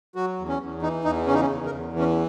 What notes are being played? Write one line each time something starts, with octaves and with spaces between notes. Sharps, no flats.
F#3 F#4
E2
C#4
E2
E3 D#4
E2 D#4
C#3 C#4
D#4
C#4
E2
A#4
E2
E3
C#4